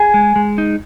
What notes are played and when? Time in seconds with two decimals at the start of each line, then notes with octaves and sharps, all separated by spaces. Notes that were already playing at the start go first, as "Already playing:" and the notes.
Already playing: G#4 G#5
0.14 G#3
0.36 G#3
0.58 D#4